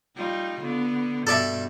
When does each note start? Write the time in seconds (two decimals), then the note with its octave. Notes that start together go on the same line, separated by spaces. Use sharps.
0.16 G3 D#4 F4
0.61 D3 B3
1.27 G2 B2 A4 D5 E5